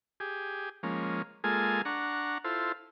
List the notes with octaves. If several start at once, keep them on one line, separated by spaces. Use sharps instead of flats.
G4 G#4
F3 G#3 A#3 C#4
G#3 A#3 F4 G#4 A4 G#5
D4 F#5 A#5 C#6
E4 F4 A4 C5